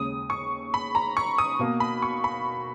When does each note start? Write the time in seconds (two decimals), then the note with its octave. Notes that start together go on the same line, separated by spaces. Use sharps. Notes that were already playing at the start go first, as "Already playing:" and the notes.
Already playing: D#2 C#3 G#3 D#6
0.30 C#6
0.74 B5
0.95 A#5
1.17 C#6
1.38 D#6
1.59 B2 A#3
1.80 B5
2.02 C#6
2.24 B5